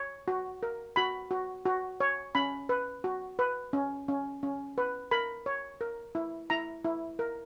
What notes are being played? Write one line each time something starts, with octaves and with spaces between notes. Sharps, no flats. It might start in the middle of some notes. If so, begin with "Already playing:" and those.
Already playing: C#5
F#4
A#4
F#4 B5
F#4
F#4
C#5
C#4 B5
B4
F#4
B4
C#4
C#4
C#4
B4
A#4 B5
C#5
A#4
E4
E4 A#5
E4
A#4